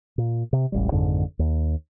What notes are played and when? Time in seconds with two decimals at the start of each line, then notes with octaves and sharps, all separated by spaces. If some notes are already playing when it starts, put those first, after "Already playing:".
0.18 A#2
0.53 C3
0.72 E1 A1 G3
0.92 G#1 F2 G#2 D3
1.39 D#2